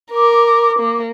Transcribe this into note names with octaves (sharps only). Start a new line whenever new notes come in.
A#4 D6
A#3